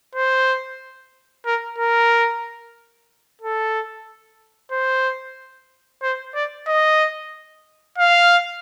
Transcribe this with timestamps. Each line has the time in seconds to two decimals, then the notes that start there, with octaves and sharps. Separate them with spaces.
0.15 C5
1.46 A#4
1.79 A#4
3.41 A4
4.72 C5
6.03 C5
6.35 D5
6.67 D#5
7.98 F5